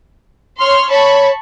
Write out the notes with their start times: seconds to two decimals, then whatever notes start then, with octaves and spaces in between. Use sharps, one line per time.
0.60 C#5 C6 F6
0.90 C#5 A5 B5 C#6